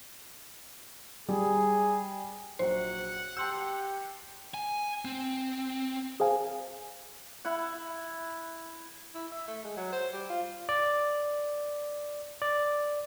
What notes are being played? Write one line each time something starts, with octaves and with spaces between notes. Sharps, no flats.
G3 G#4
A#1 F#3 C5 F#5
G4 A5 C6 E6 G6
G#5
C4
G#4 C5 F5 G#5
E4 F#5
E4
E5
A3
G#3
F#3
C5
G3
F4
D5
D5